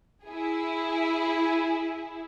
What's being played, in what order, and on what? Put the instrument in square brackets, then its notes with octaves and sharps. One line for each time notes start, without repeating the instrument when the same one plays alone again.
[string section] E4 G#4